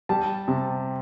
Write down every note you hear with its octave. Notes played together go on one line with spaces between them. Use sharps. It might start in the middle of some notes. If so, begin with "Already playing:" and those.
G3 A5
C3